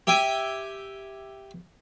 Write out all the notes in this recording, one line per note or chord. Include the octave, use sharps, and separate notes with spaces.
G4 E5 G5 G#5